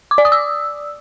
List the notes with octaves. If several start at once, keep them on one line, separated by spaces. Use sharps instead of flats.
D6
D5
D#6
E6